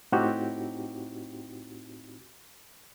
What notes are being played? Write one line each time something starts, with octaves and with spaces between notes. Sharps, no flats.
A2 C4 D#4 E4 F#4 G4